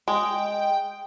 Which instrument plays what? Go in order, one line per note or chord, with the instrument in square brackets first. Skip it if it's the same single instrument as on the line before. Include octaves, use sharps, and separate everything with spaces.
[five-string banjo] G#3 [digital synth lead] G5